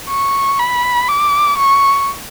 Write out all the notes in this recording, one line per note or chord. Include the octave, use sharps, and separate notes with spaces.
C#6
B5
D6
C#6